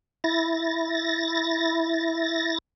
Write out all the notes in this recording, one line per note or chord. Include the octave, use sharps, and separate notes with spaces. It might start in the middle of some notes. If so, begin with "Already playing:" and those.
E4 A6 A#6